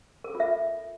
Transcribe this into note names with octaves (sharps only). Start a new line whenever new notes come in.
A#4
A4
F4
E5